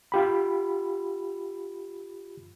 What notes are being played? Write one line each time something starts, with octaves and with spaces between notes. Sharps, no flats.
F4 G4 B5